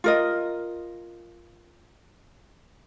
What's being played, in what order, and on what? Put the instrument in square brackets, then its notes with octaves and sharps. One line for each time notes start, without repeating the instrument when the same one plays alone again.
[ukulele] F4 A#4 D#5